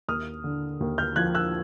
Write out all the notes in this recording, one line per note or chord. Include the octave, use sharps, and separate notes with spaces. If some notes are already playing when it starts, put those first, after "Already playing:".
D#2 D#6 F6
D3
D#2
F6 G6
F3 F#6 G#6
E6 F#6